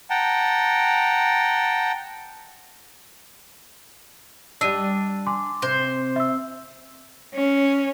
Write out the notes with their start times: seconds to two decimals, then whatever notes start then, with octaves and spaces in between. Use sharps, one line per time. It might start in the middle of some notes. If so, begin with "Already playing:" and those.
0.10 F#5 G5 A5 A#5
4.61 G3 D4 D#5 E6 D#7
5.26 G#5 C6 D6
5.62 C3 C5
6.16 E5 E6
7.35 C#4